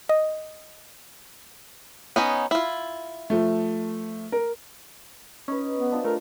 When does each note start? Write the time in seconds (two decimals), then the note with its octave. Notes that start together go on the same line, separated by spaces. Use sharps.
0.09 D#5
2.16 B3 C#4 D#4
2.51 E4 F4
3.30 F3 A3
4.32 A#4
5.48 C#4 D#4 B4
5.77 B3
5.91 D4 F4 C5
6.05 A3 A#4